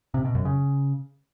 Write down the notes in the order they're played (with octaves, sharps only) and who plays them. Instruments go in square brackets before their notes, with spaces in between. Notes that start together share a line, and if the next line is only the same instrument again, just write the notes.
[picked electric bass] C3
B2
F#2
C#3